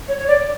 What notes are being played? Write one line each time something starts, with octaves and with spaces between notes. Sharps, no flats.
C#5
C#5
D5